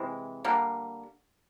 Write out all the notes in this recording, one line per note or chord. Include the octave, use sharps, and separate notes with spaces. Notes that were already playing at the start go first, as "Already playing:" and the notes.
Already playing: C3 E3 G#3
D3 G3 A#3